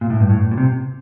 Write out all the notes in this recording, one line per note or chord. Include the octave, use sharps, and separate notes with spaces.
A#2
A2
G2
A2
A#2
C3